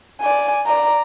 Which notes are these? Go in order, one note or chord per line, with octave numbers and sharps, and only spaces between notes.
D5 G#5
D5 A#5